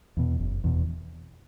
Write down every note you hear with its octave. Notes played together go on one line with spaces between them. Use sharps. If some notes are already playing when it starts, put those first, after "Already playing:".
E2 B2
F#1
E2 B2